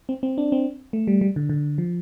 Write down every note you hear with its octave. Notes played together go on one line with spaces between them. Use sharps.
C4
C4
D4
C4
A3
G3
G3
D3
D3
F3